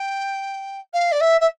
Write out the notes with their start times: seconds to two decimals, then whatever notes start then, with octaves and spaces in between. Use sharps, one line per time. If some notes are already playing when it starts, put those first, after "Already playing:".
Already playing: G5
0.93 F5
1.12 D5
1.21 E5
1.41 E5